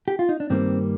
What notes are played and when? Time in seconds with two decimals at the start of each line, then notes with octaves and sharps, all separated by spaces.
0.08 G4
0.19 F4
0.29 D#4
0.40 D4
0.50 G2 D#3 G3 A#3 C4